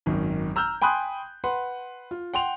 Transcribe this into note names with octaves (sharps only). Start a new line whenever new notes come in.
G#1 F#2 D#3
A#5 E6 F6 G6
G5 G#5 B5 C6 D#6 F#6
B4 F#5 C6
F4
F#5 G5 C6 F7